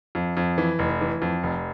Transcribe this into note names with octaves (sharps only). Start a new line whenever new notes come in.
F2
F2
E3
F1
E3
F2
F1